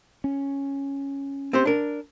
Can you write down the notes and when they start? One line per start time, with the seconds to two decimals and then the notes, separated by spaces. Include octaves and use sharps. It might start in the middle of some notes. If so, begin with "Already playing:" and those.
0.24 C#4
1.53 C4 G4 C5
1.65 D4 A#4